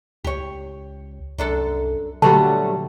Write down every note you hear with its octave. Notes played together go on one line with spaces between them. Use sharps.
C#2 G4 C#5
C2 F#2 D4 A4
A#2 D3 F#3 G3 A3 B3 A5